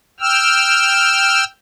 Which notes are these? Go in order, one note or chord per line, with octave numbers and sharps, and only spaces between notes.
G5 E6 F6